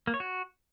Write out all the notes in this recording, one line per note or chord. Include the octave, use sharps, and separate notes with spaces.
A#3
C#5
F#4